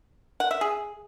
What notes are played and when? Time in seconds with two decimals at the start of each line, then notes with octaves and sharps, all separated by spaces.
0.40 F#5
0.51 E5
0.61 G#4